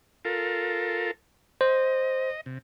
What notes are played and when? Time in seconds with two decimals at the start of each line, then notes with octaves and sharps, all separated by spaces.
0.25 F4 A4 A#4
1.61 C5 D#5
2.46 C3